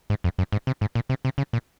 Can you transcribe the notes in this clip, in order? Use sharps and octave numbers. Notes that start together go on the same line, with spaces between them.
G#2
F2
F#2
G#2
C3
G#2
A#2
C3
C3
C#3
A#2